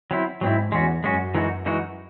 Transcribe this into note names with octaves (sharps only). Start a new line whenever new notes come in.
F#3 C4 E4
G#2 F#3 C4 E4
E2 G#3 C#4 F#4
F#2 G#3 C#4 F#4
E3 G#3 D#4 F#4
E3 G#3 D#4 F#4